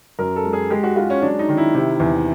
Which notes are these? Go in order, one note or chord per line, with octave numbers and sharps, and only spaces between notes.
F#2 A#4
A4
G#3
G#4
G#3 G4
F#4
G#3 F4
C#4
F#3 D4
D#4
D#3
E4
C3
E2